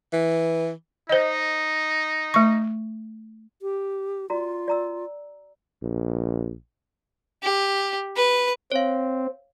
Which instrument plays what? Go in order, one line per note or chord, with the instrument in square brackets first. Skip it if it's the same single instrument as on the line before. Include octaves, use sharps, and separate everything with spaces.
[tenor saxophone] E3
[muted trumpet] D#4 [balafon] C5 D#5
[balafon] A3 C#6
[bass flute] G4
[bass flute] F4 [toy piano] F#4 D5 A#5
[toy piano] D5 A#5 E6
[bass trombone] A#1
[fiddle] G4
B4
[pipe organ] C4 [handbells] C#5 F5